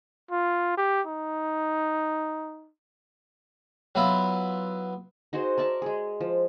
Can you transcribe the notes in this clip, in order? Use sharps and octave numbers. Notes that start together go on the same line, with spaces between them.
F4
G4
D#4
F#3 B3 E4 F4
D#4 F#4 G#4 C5
A#4 D5 E5 A5
G#3 G#4
F3